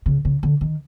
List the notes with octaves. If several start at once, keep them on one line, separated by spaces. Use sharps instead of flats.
C#3
C#3
D3
D#3